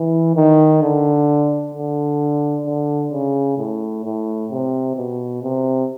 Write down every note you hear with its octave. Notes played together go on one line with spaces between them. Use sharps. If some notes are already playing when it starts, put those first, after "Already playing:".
Already playing: E3
D#3
D3
D3
D3
C#3
A2
A2
C3
B2
C3